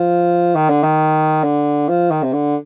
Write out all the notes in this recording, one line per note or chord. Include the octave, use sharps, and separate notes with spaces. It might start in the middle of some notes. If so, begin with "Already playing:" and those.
Already playing: F3
D#3
D3
D#3
D3
F3
D#3
C3
D3